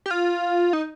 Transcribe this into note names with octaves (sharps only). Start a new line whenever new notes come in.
G4
F4
D#4